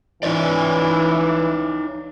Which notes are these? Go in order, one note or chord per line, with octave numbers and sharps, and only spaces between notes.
E3 D#4 C#5 D5